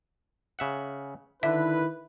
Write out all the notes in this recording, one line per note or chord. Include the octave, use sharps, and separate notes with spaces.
C#3 E5 F#5
D3 D#3 E4 B4 E5